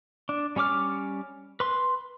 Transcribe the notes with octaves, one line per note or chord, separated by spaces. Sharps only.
D4
G3 C#4 C#5 D6 F6
B4 C6